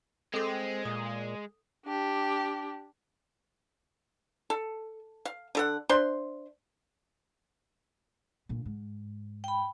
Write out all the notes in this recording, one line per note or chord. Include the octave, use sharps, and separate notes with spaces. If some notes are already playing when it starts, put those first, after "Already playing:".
G#3 C4 A4 D6
A#2 D#6
D4 G4
A4
F5
D3 A4 F#5
D4 C5 E5 C6
A#2 D3
G#2
G5 B5